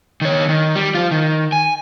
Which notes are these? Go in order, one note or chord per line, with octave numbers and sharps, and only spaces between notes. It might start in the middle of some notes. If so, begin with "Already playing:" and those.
D#3 C#5
D#3
G3
F4 C5
D#3
G#5